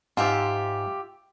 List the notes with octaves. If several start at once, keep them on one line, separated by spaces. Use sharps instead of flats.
G#2 F4 G4 E5